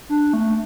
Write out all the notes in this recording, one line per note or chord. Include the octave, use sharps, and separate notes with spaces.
D4
A3